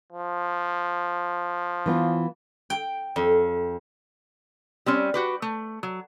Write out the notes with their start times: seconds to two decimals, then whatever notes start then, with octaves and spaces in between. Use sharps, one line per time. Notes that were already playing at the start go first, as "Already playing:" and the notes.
0.13 F3
1.86 E3 B3 F4
2.70 G5
3.16 F2
4.86 G3 C4 C#4
5.14 F#4 G4 B4
5.42 A3
5.83 F#3